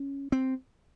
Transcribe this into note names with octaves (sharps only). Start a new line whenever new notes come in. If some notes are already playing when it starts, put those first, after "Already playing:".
Already playing: C#4
C4